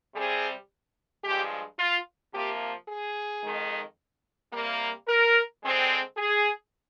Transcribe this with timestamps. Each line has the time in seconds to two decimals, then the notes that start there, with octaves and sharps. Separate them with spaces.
0.15 C3 G3 C4 G#4
1.24 G2 F3 G#3 G4
1.79 F4
2.34 C3 F3 A#3 G4
2.88 G#4
3.44 F2 D#3 G#3
4.53 C3 G3 A#3
5.08 A#4
5.63 D3 G#3 C4
6.17 G#4